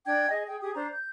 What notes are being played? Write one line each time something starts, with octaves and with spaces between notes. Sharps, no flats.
D4 G5 G#6
G#4 D#5
G#4 G5
G4 G#4 D#6
D4 C5 A#5
G6